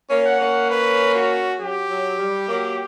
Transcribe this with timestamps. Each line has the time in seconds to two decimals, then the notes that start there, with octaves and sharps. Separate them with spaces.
0.10 A#3 C#4
0.26 F#5
0.40 A#3 C#4
0.70 B4
1.15 F#4
1.59 F#3 G4
1.90 F#3
2.19 G3
2.48 F#3 A#3